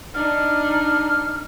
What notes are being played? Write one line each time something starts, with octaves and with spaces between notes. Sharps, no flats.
D4 D#4 F6